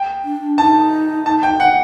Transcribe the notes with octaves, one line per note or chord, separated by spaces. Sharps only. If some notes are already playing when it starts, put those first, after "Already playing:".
Already playing: G5
D4
D#4 A5
A5
G5
F#5